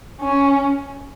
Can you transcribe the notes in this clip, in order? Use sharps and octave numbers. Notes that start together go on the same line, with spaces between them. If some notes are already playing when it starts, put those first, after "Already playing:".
C#4